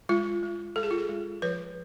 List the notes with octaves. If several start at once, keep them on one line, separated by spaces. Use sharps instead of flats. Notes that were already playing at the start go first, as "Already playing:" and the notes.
G#3 F4
G#3
G#3 A4
G#4
F4
G#4
G#3
F3 B4